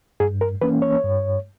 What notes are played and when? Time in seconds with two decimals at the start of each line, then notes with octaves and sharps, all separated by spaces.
0.20 G2 G#4
0.41 A#4
0.61 E3 A#3 C#4 B4
0.82 C#5
1.04 G2